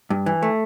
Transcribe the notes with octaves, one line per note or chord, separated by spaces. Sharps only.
G2
E3
A3